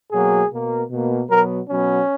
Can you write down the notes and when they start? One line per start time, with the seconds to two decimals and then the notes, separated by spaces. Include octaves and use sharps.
0.12 B2 F#3 A#3 G#4
0.51 B2 A#3
0.90 B2 A#3
1.30 B2 F#3 B3 A#4
1.69 B2 F#3 B3 C#4